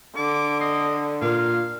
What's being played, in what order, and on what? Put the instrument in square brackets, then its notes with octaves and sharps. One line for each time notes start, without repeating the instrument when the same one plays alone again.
[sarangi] D3 [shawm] D6
[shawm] D#5 [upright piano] C7
[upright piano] A#2 A#4 [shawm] F5